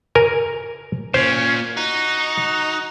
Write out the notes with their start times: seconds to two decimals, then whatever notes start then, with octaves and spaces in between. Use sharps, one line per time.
0.15 A#4 G#5
1.14 A#2 C#4 C5
1.77 D#4 F#4